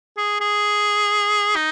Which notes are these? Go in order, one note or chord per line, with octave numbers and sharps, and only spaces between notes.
G#4
G#4
D#4